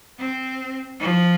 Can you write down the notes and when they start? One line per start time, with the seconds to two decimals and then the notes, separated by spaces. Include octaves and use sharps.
0.18 C4
0.99 F3